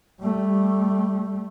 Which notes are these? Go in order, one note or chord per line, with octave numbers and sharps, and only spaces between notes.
G3 A3